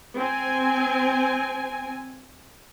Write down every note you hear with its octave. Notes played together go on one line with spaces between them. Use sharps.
C4 G#5